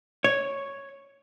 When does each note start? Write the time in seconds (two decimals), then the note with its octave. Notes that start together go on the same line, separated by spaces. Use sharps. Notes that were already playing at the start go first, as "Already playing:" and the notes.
0.24 C#5